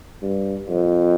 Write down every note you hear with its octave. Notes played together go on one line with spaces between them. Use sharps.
G2
F2